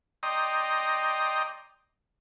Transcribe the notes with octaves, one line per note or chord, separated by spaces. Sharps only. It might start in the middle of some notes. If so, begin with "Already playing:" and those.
D5 D#5 G5 A#5 C6 D#6